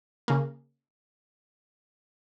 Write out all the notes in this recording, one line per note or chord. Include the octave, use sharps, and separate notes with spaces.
C#3 A#3